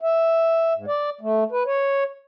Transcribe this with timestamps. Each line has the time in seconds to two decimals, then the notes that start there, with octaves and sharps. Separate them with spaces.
0.01 E5
0.75 G#2
0.87 D5
1.21 A3
1.51 B4
1.66 C#5